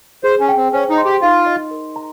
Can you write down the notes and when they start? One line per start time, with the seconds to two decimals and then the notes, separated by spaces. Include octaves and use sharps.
0.24 G#4 C5
0.40 C#4
0.49 G5
0.57 C4
0.72 C#4 C5
0.90 D#4
0.98 C6
1.05 G4
1.21 D#4 F4
1.46 D#5
1.71 A#4
1.96 A#5